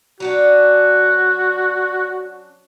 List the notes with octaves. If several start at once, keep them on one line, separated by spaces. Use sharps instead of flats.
F#3 C#4 D4 F#4